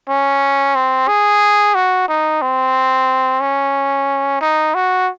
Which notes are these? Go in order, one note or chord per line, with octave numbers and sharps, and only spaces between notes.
C#4
C4
G#4
F#4
D#4
C4
C#4
D#4
F#4